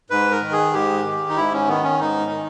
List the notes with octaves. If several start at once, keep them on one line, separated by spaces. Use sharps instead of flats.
G#2 B4
A#4
D#3
G#4
G#2 G4
D#3
D#4
G#2 E4
C#4
D#3 B3
C#4
G#2 D#4
D#3